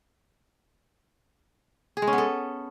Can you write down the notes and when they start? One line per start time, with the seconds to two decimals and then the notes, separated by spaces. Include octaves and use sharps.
1.97 G#4
2.02 G#3
2.07 C#4
2.13 B3
2.18 A4